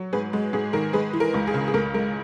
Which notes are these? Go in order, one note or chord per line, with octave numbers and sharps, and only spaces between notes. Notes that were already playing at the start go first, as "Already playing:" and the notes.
Already playing: F#3
G#2 G#4 B4
G#3
G#2 G#4
D#3 A#4
G#3 G#4 B4
E3
A#4
C#2
G#4
C#3
G#4
C#2 A#4
G#3 A#4